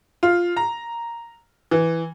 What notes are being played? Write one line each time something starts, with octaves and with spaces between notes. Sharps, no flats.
F4
A#5
E3